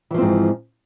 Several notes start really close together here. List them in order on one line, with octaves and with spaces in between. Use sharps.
E3 F3 C4 G#2